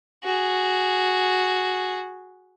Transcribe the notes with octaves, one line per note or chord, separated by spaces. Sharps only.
F#4 G#4